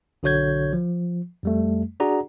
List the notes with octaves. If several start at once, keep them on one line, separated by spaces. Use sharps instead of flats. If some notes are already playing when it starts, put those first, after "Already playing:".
B1 D3 F#4 C#5 G6 G#6
F3
F2 G3 A3
D4 F#4 G#4 D5 F#5 A#5